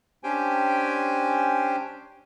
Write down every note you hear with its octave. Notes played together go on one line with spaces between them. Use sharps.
C#4 D4 G4 C5 G5 G#5